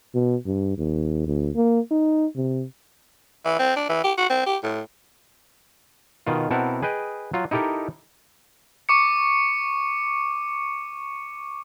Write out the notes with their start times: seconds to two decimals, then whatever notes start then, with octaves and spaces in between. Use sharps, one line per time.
0.14 B2
0.46 G2
0.78 D#2
1.27 D2
1.56 A#3
1.91 D#4
2.36 C3
3.45 E3
3.59 C4
3.76 D4
3.89 E3
4.04 G4
4.18 F#4
4.30 C4
4.46 G4
4.63 A2
6.27 B2 D#3 F4
6.51 B2 C4 E4 A#4 F#5 A5
6.82 G#4 B4 D#5 G5
7.34 F#3 F4
7.51 D#4 E4 G4 A4 A#4 D#5
8.89 C#6 D6 C#7